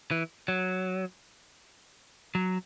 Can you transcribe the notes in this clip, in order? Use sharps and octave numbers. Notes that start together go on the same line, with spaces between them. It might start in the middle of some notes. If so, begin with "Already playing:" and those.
E3
F#3
F#3